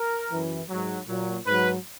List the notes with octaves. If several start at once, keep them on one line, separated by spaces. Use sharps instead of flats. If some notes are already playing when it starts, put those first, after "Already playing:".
Already playing: A#4
F#2 E3
G#2 F#3
A#2 F#3
G#2 F#3 B4